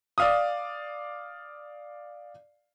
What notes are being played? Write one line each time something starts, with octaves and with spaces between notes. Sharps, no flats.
D5 F5 D#6